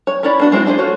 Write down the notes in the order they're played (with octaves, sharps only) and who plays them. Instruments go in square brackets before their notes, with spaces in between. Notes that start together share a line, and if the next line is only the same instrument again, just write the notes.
[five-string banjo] C#5
C#4 E4 C#5 D5 B5
B3 D4 F#4
G#3 C4 E4 F#4
D4 G#4 B4 C5
A3 F4 F#4 C#5